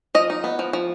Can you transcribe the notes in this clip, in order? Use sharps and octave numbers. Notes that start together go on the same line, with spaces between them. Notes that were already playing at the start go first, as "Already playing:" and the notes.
F3 D#5
D#4
B3
F3
F3